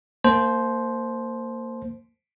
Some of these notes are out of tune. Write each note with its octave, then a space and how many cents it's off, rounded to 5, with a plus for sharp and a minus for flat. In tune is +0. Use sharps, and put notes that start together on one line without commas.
A#3 -25 C5 +0 A5 -35